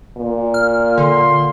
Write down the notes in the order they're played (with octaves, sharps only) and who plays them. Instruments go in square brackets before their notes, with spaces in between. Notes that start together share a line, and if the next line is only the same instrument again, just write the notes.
[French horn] A#2
[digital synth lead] F6
[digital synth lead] D3 [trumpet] C6